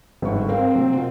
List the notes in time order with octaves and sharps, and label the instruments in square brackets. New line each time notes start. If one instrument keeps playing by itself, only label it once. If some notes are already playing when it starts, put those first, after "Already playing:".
[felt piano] G1 C#6 [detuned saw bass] G#2
[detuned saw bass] C4 [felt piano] A#4 F5
[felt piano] C3 F#3 A#3
B2 F4